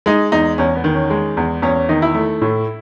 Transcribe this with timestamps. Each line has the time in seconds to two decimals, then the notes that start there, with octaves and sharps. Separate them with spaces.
0.06 G#3 D#4
0.32 E2 D#4
0.58 E2 C#4
0.76 B3
0.84 D#3
0.94 C#4
1.10 G#3
1.37 E2
1.62 E2 C#4
1.75 C#4
1.89 D#3 D#4
2.02 E4
2.14 A3
2.42 A2